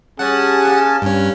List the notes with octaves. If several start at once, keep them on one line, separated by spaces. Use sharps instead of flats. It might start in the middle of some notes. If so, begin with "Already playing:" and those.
G3 C#4 G#4 F#5 G#5 A5
A#3 G4
G2 C#4